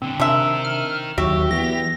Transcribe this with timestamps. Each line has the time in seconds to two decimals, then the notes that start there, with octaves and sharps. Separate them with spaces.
0.02 A#2 D3 C4
0.20 C3 G#3 D4 D#4 A#4 E5
0.65 F6
1.18 D#2 D#3 F#3 F#4 G4 E5
1.51 E3 B3 A#6